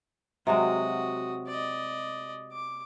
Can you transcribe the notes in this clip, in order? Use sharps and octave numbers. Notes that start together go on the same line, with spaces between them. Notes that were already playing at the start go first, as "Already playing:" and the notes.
C3 F#3 G#3 F#4 D#6
D5 D#5
D6